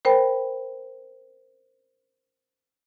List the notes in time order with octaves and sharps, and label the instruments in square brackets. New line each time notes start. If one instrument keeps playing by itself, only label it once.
[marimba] A#4 C5 G5 B5